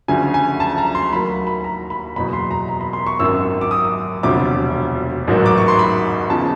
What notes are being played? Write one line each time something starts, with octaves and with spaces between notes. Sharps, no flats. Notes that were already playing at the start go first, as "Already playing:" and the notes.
D2 C#3 F3 G#5
G#5
A5
A#5
C6
D#2 D#3 F#3 B5
B5
A#5
B5
F#1 E2 B2 B5
C6
A#5
A#5
B5
C6
C#6
G#1 F#2 D#3 E6
D6
D#6
E1 D2 C3 F3 D6
A1 G#2 D#3 F#3
D6
C#6
C6
B5
E2 C#3 F3 A5